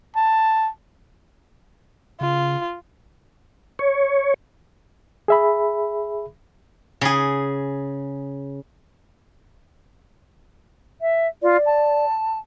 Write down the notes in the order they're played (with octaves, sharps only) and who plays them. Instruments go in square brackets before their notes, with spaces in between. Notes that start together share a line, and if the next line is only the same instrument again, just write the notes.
[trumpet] A5
[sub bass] C#3 [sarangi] F4
[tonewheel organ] C#5
[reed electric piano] G#4 E5 B5
[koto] C#3 G#4
[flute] E5
[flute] F4 [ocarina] D5
[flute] A5